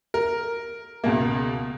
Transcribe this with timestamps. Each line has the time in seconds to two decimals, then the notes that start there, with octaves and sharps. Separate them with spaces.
0.14 A#4
1.04 C#2 B2 A#3